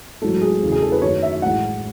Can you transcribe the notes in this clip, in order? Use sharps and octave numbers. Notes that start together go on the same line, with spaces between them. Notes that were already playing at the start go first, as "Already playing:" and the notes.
A1 G#2 F#3 A3 A4
G#4
E2 C#3 E3 A3
G#4
A4
B4
F#2 D#3 F#3 A3 C#5
E5
A1 A2 G#3 F#5